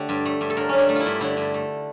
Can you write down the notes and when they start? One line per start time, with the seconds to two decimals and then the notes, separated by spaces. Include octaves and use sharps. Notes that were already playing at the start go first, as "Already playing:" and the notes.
Already playing: D3 A3 G4 A4
0.09 G2
0.25 A3
0.41 G2
0.50 A4
0.57 D3 A#4
0.69 G2 C#4
0.78 D4
0.89 A3
0.95 F4
1.00 E4
1.06 G2
1.21 D3 E4
1.37 G2
1.54 A3